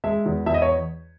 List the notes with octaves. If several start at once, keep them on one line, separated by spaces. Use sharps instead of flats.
G#3 E5
E2
E2 E5
D#5
C#5